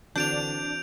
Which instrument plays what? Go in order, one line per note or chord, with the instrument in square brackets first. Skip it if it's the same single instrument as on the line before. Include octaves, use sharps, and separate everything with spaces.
[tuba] D3 [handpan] E3 C4 F#4 [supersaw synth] D4 [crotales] G6 D7 F7